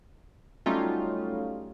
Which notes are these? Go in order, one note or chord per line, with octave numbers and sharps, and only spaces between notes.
F#3 G3 A3 C#4 D#4 F4